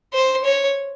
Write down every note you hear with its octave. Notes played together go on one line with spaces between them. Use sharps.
C5
C#5